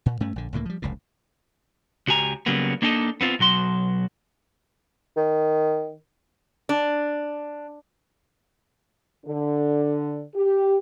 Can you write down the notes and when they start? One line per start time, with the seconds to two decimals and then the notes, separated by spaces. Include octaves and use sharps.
0.06 A#2
0.20 G2 A3 C#4
0.36 A#1 D3
0.53 C#2 A2 D3 A#3
0.65 F3 G3
0.82 F1 C#2 A2
2.08 C#2 F#4 G4 G#5 A#5
2.46 C#3 F#3 G3 A#3 B3
2.82 A#3 D4 D#4 A4 D5 D#5
3.21 B3 C4 F4
3.39 B1 F#3 F#4 C6
5.17 D#3
6.69 D4
9.26 D3
10.35 G4